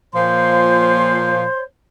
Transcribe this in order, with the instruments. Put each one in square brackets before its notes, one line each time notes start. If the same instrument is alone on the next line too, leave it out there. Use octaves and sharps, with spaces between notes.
[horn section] A#2 F3 [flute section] C5 C#5 C6